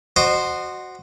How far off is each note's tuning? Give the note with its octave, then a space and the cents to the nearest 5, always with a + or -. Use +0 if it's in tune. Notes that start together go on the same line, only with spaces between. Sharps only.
F#4 +0 C5 +0 D#5 -30